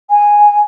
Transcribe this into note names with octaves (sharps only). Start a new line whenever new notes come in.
G#5